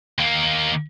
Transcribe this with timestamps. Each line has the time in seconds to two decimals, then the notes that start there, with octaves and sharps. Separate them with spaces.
0.18 D#2 A#3